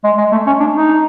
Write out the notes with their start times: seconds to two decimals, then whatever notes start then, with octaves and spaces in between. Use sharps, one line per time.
0.04 G#3
0.18 G#3
0.32 A3
0.47 C#4
0.60 D4
0.74 D#4